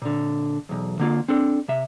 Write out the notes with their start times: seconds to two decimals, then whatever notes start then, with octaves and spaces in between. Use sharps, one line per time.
0.02 A#2 D3
0.69 B1 E2
0.99 D3 A#3 F4
1.28 C4 D4 A4
1.68 C3 E5